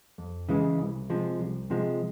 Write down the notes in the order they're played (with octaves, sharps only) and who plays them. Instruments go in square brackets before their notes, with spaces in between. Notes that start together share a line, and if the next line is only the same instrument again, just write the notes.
[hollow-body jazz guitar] F2
C#3 E3 G#3
C2
C3 F3 G#3
C2
C3 F3 G#3